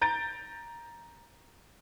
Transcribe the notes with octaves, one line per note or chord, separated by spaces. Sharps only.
A#5 G6 A6 D7